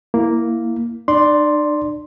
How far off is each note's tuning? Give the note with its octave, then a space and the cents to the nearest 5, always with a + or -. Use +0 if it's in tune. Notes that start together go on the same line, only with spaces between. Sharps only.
A#3 +0 E4 +0
D4 +45 D5 +0 C6 +0